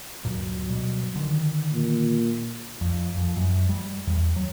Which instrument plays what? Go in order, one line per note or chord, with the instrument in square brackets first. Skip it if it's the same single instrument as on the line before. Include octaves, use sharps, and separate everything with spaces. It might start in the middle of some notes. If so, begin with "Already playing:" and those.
[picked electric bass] D2 G2 A#2 [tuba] F#3
[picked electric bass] B2 G3
D3 D#3
[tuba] A#2
[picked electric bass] F2
F2
F#2
G3
E2
F#3